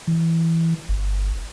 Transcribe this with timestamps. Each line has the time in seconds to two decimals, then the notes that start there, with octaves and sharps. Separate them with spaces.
0.07 E3
0.89 G1